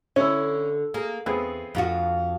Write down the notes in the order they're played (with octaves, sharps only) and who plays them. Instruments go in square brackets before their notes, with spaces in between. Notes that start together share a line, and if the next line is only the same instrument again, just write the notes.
[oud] D3 [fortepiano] C#4 E4
[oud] A#3 [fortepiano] G#4
[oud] E2 [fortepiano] B3 C4 G#4
[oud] F2 F4 F#4